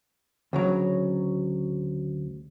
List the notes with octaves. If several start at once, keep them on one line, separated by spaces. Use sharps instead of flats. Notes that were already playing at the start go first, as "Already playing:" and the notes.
D2 C#3 F#3